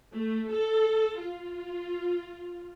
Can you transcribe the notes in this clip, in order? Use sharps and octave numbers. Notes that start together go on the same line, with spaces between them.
A3
A4
F4